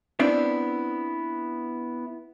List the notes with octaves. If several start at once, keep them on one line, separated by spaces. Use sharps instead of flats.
B3 C4 D4 E4